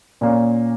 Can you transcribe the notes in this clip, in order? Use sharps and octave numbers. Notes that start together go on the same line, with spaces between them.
A#2 A#3 C#4